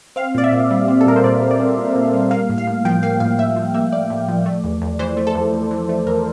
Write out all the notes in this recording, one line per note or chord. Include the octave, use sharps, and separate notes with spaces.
C4 F5
A#2 D5
E5
A#2
G3
C4
A4
A#2 A#4
C5
A#2 D5
G3
D5
C4
A#2
A#2
G3
A#3 F5
A2
F5
A2
F3 G5
A#3 F5
A2 F5
A2 E5
F3
A#3 E5
A2 D5
A2
F3
A3
E2
E2
E3 C5
A3
A4
E2
E2
E3
A3
E2 A#4